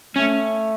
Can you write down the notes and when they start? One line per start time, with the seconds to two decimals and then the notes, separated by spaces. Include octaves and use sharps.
0.15 A3 C#4